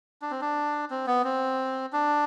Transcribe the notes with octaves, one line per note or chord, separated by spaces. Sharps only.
D4
C4
D4
C4
B3
C4
D4